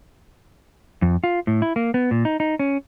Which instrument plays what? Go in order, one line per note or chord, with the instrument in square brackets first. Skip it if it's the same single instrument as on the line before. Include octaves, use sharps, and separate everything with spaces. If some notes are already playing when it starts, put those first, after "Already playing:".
[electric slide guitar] F2
F4
A2
E4
A#3
B3
A#2
D#4
D#4
C#4